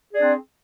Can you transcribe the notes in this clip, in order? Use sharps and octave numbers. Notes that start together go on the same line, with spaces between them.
C4 D4 G#4 D5